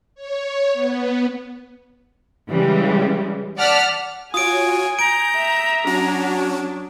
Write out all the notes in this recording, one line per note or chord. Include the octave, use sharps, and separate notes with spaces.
C#5
B3
C#3 E3 G3 G#3
D5 F#5 A5 F6 B6
F4 F#4 C#5 G#5 D#6 D7
A#5 G6 D7
E5
F#3 C#4 D4 F#4